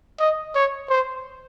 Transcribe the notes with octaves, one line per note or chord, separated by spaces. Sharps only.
D#5
C#5
C5